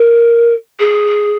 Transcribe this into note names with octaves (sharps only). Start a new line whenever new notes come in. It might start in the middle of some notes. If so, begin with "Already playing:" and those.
Already playing: A#4
G#4